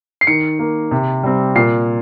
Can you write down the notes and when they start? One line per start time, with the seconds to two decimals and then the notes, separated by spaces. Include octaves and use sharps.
0.21 C7
0.27 D#3 C#7
0.59 A#3
0.91 C3
1.23 G3 C4
1.55 A#2 C7